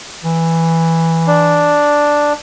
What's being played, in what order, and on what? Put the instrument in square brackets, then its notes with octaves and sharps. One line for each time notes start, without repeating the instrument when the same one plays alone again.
[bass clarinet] E3
[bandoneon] D4